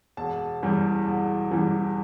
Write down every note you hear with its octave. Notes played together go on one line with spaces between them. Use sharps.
E1 A5
E2 E3 G3
E1
E2 E3 G3